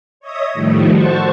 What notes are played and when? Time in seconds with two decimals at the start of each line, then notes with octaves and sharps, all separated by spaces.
0.20 C#5 D#5 E5 D#6
0.54 A2 D#3 F3 G3 A3
0.89 F#4 C5 A5 C#6